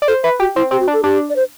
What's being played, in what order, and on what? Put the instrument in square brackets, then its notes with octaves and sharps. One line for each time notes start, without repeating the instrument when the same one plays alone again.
[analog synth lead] D5
[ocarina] A4 [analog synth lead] C5
[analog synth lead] B4 [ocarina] E5
[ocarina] F#4 [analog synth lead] G4
[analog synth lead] C4 [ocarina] E4
[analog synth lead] C4 [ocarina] G4
[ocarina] F#4
[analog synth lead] D4
[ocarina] A4
[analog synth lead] D4 [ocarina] G4
[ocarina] D5
C5